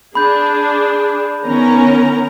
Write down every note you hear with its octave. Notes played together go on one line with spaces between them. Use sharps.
D4 G#4 B5 G6
D#3 B3 C#4 A#4 A#5